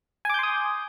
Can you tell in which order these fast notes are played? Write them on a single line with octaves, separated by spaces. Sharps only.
G#5 D6 G6 C6 D#6